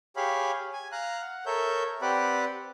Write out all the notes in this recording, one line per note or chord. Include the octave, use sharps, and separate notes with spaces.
G4 G#4 C#5 F5 B5
G#5
F5 A#5 F#6
F#5
A4 A#4 C#5 E5 G6
C4 G4 B4 D5 F#5 B5